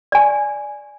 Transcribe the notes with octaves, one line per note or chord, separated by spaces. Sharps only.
D5 G#5